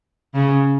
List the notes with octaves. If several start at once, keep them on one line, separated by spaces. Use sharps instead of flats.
C#3